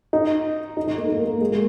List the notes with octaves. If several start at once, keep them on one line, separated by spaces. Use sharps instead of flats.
D#4
D#4
D#4
A#3
A#3
A#3
G#3
A#3